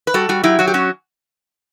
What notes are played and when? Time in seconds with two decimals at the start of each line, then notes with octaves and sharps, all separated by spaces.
0.07 B4
0.14 G3 F#4 A4
0.29 G3 F#4
0.43 F#3 E4 G4
0.59 F#3 F#4
0.67 G4
0.74 C#4 F#4